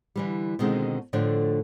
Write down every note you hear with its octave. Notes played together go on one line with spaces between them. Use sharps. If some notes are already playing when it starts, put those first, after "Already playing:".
D3 E3 G3
B2 D3 D#3 G#3 C4
A2 D3 F3 A3 D4